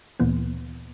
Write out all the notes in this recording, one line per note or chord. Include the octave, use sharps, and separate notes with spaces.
D2 A#2 E3 A#3 B3